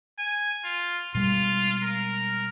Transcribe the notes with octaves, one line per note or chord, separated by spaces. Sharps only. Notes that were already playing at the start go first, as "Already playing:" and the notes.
G#5
F4
B2 G3 G#3 F4
A#4